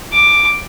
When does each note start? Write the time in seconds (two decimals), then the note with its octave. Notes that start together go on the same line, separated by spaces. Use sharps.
0.12 D6